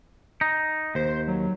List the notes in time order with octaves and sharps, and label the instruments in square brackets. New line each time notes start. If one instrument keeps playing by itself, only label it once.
[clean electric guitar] D#4
[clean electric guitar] D#2 [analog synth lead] C5
[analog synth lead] F#3